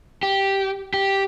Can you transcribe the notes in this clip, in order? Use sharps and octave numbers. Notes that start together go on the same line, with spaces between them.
G4
G4